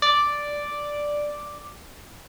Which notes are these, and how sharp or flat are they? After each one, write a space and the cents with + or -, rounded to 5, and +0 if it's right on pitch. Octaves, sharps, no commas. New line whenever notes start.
D5 +0